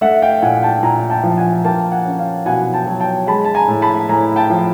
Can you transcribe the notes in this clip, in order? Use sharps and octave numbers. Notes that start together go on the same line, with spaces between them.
A3 E5 F#5
F5 G5
A#2 F#5 G#5
G5 A5
A#2 G#5 A#5
G5 A5
F3
F#5 G#5
A#3 G5 A5
F#5 G#5
C#4
F5 G5
B2 F#5 G#5
G5 A5
F#3
G5 A5
G#3 A5 B5
A5
G#5 A#5
A2
A5 B5
A2 G#5 A#5
G5 A5
F3